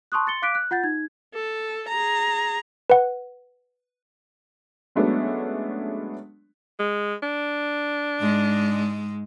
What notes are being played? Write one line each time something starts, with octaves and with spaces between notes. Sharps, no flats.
A5 C6 C#6 D#6 F#6
C6 A6 C#7 G7
F5 D6 F#6 B6 D7
F#6
F4 F#5 G6 A6
D#4 G#6
A4
G#4 A#5
B4 F#5
F#3 G#3 A3 B3 C#4 D4
G#3
D4
G#2 G#3